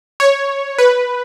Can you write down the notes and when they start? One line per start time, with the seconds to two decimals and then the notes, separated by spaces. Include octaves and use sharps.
0.20 C#5
0.78 B4